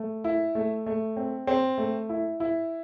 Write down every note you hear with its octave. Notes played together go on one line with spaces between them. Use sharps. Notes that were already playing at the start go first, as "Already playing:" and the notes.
Already playing: A3
E4
A3
A3
C4
C4
A3
E4
E4